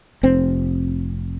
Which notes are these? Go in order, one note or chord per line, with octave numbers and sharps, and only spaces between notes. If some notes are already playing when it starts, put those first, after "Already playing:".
F1 C4